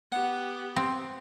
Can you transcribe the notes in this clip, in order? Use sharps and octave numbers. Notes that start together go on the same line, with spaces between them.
B3 G4 F#5
C4